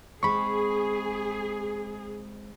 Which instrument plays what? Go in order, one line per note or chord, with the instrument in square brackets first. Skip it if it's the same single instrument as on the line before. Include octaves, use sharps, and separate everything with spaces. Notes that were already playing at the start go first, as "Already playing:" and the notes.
[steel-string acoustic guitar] G#3 C4 [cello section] G#4 [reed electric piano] B5 C#6